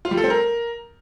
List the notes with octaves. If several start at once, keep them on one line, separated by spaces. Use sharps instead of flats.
F4
G3
A4
C4
A#4